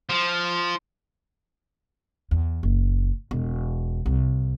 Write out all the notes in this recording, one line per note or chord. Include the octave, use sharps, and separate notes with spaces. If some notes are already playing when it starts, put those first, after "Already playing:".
F3
E2
F#1
E1
C2